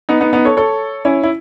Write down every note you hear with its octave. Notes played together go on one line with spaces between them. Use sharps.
B3 D#4
B3 D#4
B3 D#4
A4 C#5
A4 C#5
C#4 E4
E4